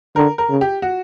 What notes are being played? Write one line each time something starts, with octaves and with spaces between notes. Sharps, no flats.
D3 A#4
A#4
C#3
G4
F#4